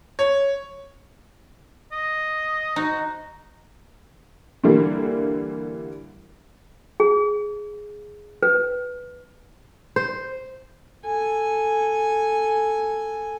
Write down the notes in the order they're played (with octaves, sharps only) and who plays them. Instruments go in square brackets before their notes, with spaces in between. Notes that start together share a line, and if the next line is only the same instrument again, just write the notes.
[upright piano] C#5
[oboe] D#5
[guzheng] D#4 [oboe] F#4
[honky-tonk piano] D3 E3 G3 A#3
[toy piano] G#4
B4
[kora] C5
[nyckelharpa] A4 G#5